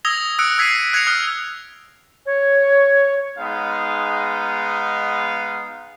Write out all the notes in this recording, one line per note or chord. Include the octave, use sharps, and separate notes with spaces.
D#6 E6 G#6 A#6 F7 G7
D#6 E6 F#6 C#7 D7
E6 G#6 B6 C7 D7 D#7
F#6 G#6 A#6 C#7 F7
D#6 F6 F#6
C#5
G#3 B3 D#4 F5